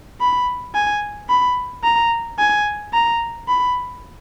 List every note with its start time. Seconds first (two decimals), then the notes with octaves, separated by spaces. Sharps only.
0.21 B5
0.75 G#5
1.29 B5
1.84 A#5
2.39 G#5
2.93 A#5
3.48 B5